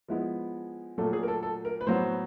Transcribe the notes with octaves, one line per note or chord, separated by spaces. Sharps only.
F3 G#3 B3 E4
A#2 F#3 A3 A4
G#4
A#4
A4
A4
A#4
B4
A2 F#3 B3 C5